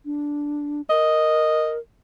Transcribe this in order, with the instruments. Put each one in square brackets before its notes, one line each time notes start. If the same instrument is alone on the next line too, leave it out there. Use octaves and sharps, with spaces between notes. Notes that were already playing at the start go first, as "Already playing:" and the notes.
[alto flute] D4
[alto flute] A#4 [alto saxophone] D#5